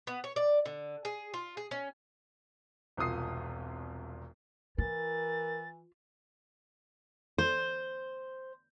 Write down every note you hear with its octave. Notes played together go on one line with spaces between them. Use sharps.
B3
C#5
D5
D3
G#4
F4
G#4
C#4
E1 C2 F4 D#6 C7
E3 F4 A#4 A6
C5